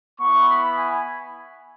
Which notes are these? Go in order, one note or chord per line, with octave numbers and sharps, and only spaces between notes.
B3 E4 C#6
B5
G#5